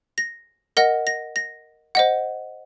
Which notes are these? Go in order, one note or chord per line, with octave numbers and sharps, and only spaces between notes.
A#6
A#4 D#5 F#5 A#6
A#6
A#6
C5 D#5 F#5